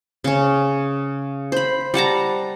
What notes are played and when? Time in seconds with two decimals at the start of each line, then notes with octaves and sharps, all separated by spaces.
0.24 C#3 C#4
1.52 C5 B5
1.94 G3 F#5 A5 A#5